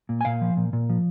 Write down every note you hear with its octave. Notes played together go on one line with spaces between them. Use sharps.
A#2
G#5
A#2 F5
F3
A#2
A#2
F3